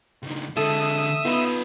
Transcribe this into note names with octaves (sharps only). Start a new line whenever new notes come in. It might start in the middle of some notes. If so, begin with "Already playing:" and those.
C#2 D#3
D3 G#3 A4 E5 D#6
B3 D#4 F4